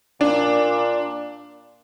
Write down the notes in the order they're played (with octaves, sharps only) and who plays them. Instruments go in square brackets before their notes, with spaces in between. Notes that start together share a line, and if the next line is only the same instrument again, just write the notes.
[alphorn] A#2 [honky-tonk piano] D4